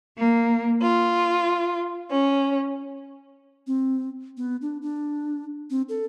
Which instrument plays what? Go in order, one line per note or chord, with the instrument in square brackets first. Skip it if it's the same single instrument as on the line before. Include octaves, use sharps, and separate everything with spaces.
[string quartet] A#3
F4
C#4
[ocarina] C4
B3
D4
D4
C4
A4